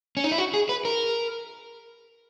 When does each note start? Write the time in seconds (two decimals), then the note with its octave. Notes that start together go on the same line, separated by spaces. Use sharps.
0.17 C#4
0.24 D#4
0.32 E4
0.38 F#4
0.54 G#4
0.69 B4
0.85 A#4